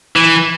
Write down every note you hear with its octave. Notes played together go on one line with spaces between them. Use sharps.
E3